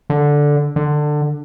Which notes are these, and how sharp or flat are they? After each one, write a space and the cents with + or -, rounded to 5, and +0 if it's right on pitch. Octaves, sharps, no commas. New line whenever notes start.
D3 -5
D3 +20